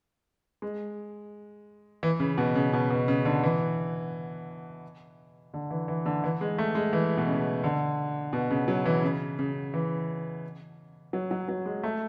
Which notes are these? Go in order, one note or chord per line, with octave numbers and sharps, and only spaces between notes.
G#3
E3
C#3
B2
C#3
B2
B2
C#3
D3
E3
D3
E3
E3
D3
E3
G#3
A3
G#3
E3
B2
C#3
D3
B2
C#3
F#3
E3
C#3
C#3
E3
F#3
F#3
F#3
G#3
A3